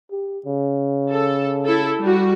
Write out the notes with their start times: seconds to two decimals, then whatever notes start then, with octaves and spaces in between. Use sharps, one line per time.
0.11 G4
0.46 C#3
1.10 A4
1.65 E4 A4
2.00 G3 F#4